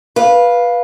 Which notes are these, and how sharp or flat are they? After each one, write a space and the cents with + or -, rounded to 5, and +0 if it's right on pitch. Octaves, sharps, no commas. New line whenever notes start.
B4 -15 F5 +0